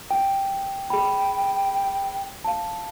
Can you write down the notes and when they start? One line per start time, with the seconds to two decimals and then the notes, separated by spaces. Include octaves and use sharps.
0.11 G5
0.90 G#4 G5 B5
2.44 F5 A5